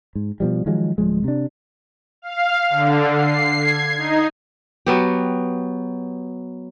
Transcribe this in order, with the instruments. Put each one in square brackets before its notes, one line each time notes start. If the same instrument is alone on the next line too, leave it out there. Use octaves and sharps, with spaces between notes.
[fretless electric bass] G#2
B2 F3 G3
D#3 F3 F#3 G#3
D1 F3 G#3
C3 D4
[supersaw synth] F5
D3
C7
G#6
D#4
[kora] F#3 B3 G4